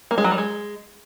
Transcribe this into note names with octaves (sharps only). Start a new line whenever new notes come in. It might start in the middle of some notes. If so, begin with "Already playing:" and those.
A#3
G#3
F#3
G3
G#3